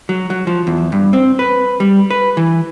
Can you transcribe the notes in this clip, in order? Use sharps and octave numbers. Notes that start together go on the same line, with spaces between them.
F#3
F#3
F3
E2
G2
C4
B4
G3
B4
E3